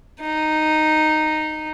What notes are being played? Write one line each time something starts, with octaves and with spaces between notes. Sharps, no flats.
D#4